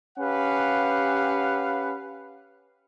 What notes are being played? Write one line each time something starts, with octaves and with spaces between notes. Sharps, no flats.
C#4 G4 B4 F5 F#5